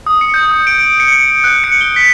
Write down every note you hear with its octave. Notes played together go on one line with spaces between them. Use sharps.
D#6
C#7
G6
D#6
D7
D7
C#7
C#7
F#6
C#7
G7
B6